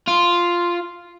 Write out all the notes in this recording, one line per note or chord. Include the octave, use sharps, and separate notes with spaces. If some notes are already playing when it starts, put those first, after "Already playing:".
F4